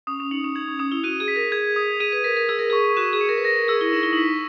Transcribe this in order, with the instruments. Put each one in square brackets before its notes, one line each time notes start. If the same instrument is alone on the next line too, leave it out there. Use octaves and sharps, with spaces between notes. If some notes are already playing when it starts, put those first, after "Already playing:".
[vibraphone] C#4 [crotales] D#6
[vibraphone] C#4
[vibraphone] D#4 [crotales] C#7
[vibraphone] C#4
[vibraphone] D#4 [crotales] G#6
[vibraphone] C#4
[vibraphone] C#4 [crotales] D#6
[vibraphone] E4
[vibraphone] F#4 [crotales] D#7
[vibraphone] G#4
[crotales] B6
[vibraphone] A#4
[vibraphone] G#4 [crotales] G#6
[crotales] D#6
[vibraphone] G#4 [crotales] D#7
[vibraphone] B4
[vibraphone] A#4 [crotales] B6
[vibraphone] A#4
[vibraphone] G#4 [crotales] E6
[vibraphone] A#4
[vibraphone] G#4 [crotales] C#6
[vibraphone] F#4 [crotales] E7
[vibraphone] G#4
[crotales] C#7
[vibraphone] A#4
B4
[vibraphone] A#4 [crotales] A#6
[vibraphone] A#4
[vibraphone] G#4 [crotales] E6
[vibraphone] E4
[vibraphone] D#4 [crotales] E7
[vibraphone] E4
[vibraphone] D#4 [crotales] B6